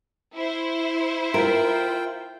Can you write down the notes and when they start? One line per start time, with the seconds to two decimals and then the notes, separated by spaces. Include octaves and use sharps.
0.34 E4 C5
1.34 F4 A#4 G5